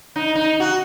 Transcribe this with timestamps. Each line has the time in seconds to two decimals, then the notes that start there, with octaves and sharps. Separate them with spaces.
0.16 D#4
0.35 D#4
0.60 F#4